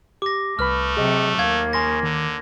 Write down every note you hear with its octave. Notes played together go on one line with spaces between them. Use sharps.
G4 D6 A#6
C2 A3 B4 B5 F6
C3 F#3 G#4 D#5
D#2 A#3 F5 G#6
C#3 G#5 C6 G#6 A#6
D3 D#3